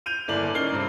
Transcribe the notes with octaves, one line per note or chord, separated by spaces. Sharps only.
G6 D#7 F7
G1 A2 A#3 D5 F#7
C#4 D#4 A#4 F6 C7 G7
G2 C3